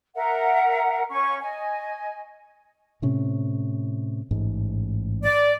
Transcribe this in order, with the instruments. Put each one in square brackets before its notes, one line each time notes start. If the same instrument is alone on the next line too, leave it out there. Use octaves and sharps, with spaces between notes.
[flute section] A#4 E5 F#5
C#4 C#6
D#5 G#5
[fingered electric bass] A2 C3 C#4
A1 G#2
[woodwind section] D5